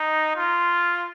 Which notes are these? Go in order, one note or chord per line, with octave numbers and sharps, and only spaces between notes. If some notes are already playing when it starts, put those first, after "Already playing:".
Already playing: D#4
F4